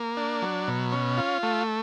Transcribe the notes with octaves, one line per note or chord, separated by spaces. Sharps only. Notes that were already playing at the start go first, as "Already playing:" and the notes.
Already playing: A#3
D4
F#3
B2
C#4
F4
A3